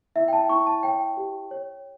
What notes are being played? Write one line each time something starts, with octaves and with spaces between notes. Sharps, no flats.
E4 E5
G5
A5
E4 C#6
A5
C#5 G5
G4
C#5